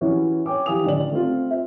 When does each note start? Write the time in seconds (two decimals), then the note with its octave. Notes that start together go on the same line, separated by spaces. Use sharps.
0.01 E3 C#4 E4 F#4 G4 C#5
0.46 C#5 G5 G#5 D6
0.66 E3 G4 F5 G#5 D#6 F7
0.84 A1 D3 D#3 D5 F#7
1.12 A3 C4 F4
1.51 E5